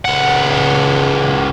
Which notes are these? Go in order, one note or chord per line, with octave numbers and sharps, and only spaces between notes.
C#2 F#5